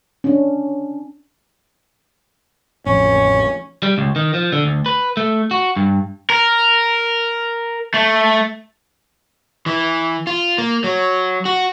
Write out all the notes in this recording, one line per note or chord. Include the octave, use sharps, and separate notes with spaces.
C#4 D4
A1 F2 C#4
G3
C#2
D#3
F3
D3
D2
B4
A3
F#4
G2
A#4
A3
E3
F4
A#3
F#3
F#4